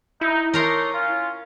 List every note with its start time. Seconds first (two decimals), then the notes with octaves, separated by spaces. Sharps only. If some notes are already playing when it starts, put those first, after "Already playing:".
0.21 D#4 E4
0.54 A3 D4 D#4 A#4 C#5 A#5 C6
0.94 C#4 F4 F5